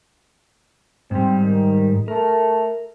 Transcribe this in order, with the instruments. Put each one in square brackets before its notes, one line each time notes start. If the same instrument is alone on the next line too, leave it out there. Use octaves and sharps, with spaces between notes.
[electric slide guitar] G#2 G3 [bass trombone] C4
[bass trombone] D#3
[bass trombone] A3 [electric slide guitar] A#4